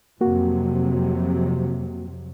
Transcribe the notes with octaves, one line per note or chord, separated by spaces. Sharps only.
F2 C3 F#3 A#3 F#4